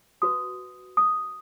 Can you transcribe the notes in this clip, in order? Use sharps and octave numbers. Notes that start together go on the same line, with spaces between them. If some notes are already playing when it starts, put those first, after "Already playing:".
F#4 B4 D#6
D#6